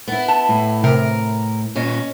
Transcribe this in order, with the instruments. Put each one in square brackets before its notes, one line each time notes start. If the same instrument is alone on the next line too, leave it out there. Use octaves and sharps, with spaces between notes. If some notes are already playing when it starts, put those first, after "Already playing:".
[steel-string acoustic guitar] B3 E4
[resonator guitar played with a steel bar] A5
[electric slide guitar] A2
[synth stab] C3 [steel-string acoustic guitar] A#4
[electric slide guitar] A#2 D#5 [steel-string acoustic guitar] C#4